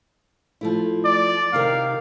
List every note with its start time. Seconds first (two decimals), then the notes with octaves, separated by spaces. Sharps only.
0.61 F3 A3 E4
1.05 D5
1.53 C3 D#3 A#4 F5